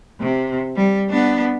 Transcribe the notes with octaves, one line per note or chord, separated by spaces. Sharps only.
C3
G3
B3 D4